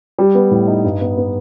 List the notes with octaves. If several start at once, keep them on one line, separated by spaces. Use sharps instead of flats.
G3
B3
A2
D#4
G2
B3
B3